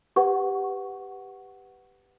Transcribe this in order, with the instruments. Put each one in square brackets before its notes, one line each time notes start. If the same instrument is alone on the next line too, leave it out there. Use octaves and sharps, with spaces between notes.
[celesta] G4 B4 F#5 C#6